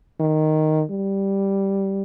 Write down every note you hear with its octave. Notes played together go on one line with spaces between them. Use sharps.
D#3
G3